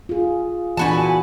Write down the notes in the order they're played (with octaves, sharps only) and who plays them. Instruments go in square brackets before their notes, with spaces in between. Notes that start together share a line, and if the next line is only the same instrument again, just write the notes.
[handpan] F4 G#4
[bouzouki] A#2 F#4 A5 [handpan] E3 B3 D4 [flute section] G#5 B5